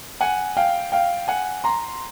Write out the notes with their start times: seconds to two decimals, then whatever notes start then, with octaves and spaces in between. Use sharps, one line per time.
0.21 F#5 G#5
0.57 F5 G5
0.92 F5 G5
1.28 F#5 G#5
1.64 A#5 C6